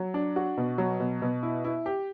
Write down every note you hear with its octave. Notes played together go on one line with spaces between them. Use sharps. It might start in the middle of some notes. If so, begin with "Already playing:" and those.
Already playing: F#3
D4
F#4
B2
F#3
B2
B2
E4
E4
G4